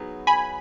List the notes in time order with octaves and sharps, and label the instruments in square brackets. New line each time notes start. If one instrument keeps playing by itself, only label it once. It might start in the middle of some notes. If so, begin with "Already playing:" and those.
Already playing: [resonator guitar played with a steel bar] F#3 B3 D#4 G#4
[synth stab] G#5 B5